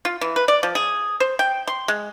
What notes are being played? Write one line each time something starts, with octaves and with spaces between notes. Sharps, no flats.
F4
E3
B4
D5
F3
G#4
C5
G5
C6
G#3